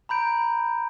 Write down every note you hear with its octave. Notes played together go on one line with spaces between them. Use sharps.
A#5 B5 G6 D7